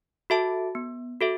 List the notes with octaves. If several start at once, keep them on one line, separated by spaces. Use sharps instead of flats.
F#4 A4 E5 A5
B3
F#4 A4 E5